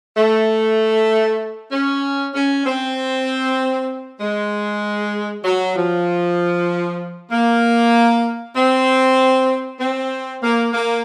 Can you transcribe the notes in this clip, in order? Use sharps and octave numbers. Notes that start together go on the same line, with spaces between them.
A3
C#4
C#4
C4
G#3
F#3
F3
A#3
C4
C4
A#3
A#3